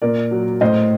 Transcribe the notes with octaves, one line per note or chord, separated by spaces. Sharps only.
A#2 A#4 D5
F#3
A2 C5 D#5